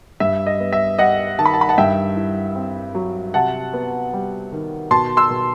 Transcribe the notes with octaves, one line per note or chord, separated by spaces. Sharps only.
G2 E5
D#5
B3
E5
G3 D#5 F#5
D#3 A5
B5
A5
B5
F#5 A5
G2 E5 G5
E4
C4
F#3
C3 F#5 A5
B3
G3
D#3
B2 A5 C6
C6 E6
B2